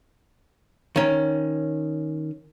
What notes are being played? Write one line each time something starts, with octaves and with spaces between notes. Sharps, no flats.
D#3 C#4